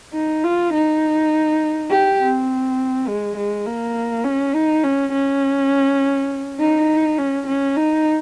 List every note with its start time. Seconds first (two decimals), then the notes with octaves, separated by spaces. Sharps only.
0.14 D#4
0.44 F4
0.73 D#4
1.90 G4
2.20 C4
3.08 G#3
3.37 G#3
3.66 A#3
4.24 C#4
4.54 D#4
4.83 C#4
5.12 C#4
6.60 D#4
7.18 C#4
7.47 C#4
7.76 D#4